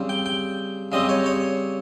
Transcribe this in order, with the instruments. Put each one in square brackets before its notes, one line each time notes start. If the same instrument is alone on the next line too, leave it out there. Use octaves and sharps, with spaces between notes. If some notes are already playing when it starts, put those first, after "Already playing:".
Already playing: [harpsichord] C#3 G3 C4
G5
G5
C#3 G3 C4 D#5
C#5
C#5